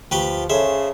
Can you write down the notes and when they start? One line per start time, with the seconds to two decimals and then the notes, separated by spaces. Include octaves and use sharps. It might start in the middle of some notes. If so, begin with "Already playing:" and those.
0.11 D2 F3 G4 B4 G5
0.50 C#3 G#4 A4 C5 C#5 E5